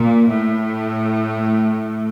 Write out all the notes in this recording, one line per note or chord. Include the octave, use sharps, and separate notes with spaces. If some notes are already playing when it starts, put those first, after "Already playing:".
Already playing: A#2
A2